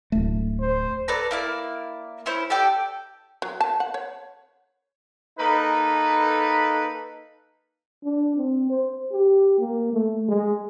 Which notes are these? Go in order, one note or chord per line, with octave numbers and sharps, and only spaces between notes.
D1 A3
C5
A4 B4 D5 A#5
A#3 E4 D5
C#4 E4 C5
G4 A4 D5 G5
F#3
A5
F#5
C#5
A#3 D#4 A4 B4
D4
C4
C5
G4
A#3
A3
G#3